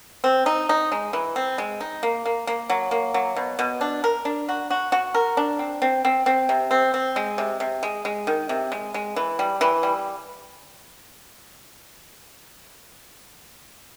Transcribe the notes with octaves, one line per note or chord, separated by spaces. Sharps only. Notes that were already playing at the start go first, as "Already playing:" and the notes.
C4
D#4
D#4
G#3
E3
C4
G#3
D#4
A#3
A#3
A#3
F#3
A#3
F#3
B2
B2
D4
A#4
D4
F#4
F#4
F#4
A#4
D4
C4
C4
C4
C4
C3
C4
C4
G#3
C3
C3
G#3
G#3
D#3
C3
G#3
G#3
E3
G3
E3
G3